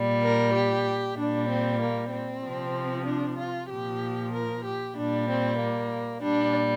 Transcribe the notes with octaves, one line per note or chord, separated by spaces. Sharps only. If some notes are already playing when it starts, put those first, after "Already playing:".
Already playing: A#2 G3
A#4
G4
A#2 G3 D4
C4
A#3
C4
C3 F3
D4
F4
A#2 F3 G4
A#4
G4
A#2 G3 D4
C4
A#3
A#2 G3 D4